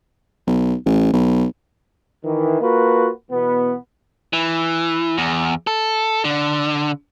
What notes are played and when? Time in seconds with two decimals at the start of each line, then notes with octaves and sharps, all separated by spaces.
0.47 B1
0.86 A1
1.13 B1
2.24 D#3 E3
2.61 A#3 F4 F#4 B4
3.31 B2 E3 B3
4.33 E3
5.18 E2
5.67 A4
6.25 D3